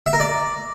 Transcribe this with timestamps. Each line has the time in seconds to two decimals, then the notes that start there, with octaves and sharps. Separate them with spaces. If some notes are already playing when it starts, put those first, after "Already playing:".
0.06 E5
0.13 A#4
0.20 D5